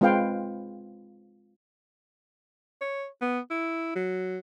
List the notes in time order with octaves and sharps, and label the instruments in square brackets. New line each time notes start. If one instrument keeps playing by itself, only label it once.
[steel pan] G#3 C4 F4 B4 F5 G5
[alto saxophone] C#5
B3
E4
F#3